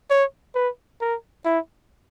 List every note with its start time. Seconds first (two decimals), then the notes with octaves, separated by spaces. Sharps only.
0.10 C#5
0.55 B4
1.01 A#4
1.45 E4